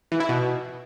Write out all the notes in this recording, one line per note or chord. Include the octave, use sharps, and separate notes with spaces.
E3
E4
B2